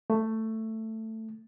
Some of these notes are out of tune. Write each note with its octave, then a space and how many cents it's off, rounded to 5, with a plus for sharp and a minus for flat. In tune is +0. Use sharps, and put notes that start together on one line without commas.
A3 +10